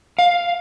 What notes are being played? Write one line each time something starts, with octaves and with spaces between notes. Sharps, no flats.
F5